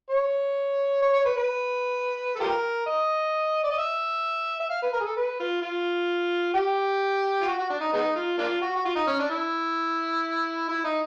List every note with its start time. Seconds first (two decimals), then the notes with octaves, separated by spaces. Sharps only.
0.10 C#5
1.02 C#5
1.13 C#5
1.25 B4
1.37 B4
2.36 A4
2.40 F4 G4 A#4
2.87 D#5
3.64 D5
3.71 D#5
3.79 E5
4.60 E5
4.70 F5
4.83 B4
4.93 A#4
5.00 G#4
5.05 A4
5.17 B4
5.40 F4
5.62 F4
6.54 G4
7.41 F4
7.47 F#4
7.59 F#4
7.70 D4
7.81 D#4
7.93 G#3 B3 D#4
8.16 F4
8.38 A#3 D4 F4
8.61 F#4
8.76 F#4
8.85 F4
8.96 D#4
9.07 C#4
9.19 D4
9.30 E4
10.69 E4
10.84 D#4